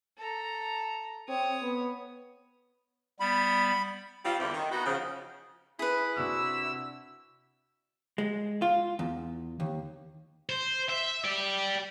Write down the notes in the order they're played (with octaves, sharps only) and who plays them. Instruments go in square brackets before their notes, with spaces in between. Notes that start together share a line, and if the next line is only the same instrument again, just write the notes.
[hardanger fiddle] A4 A#5
[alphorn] C4 [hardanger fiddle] C#5 D#6
[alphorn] B3
[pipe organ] G3 B3 [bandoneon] B5
[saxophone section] G3 C4 F4
E2 D3 C4 E5
D#3
B3 D#4 F#4
C#3 F3
[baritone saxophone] E4 [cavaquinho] G#4 B4
[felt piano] C3 D4 F#4 [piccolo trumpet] E6
[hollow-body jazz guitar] G#3
F4
E2
D#2
[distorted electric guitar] C5
E5
G4 D5